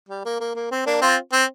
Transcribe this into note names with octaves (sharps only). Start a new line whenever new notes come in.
G3
A#3
A#3
A#3
C4
A#3 D4
C4 F4
C4